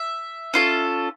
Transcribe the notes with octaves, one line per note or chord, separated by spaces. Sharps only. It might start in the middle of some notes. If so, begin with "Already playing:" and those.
Already playing: E5
C#4 F4 A4